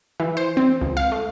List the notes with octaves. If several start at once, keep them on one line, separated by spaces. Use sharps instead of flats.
E3
C5
C4
C#2
F5
A3